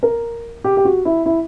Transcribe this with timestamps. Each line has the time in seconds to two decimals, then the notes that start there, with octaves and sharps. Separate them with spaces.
0.03 A#4
0.64 G4
0.77 G4
0.85 F#4
1.05 E4
1.26 E4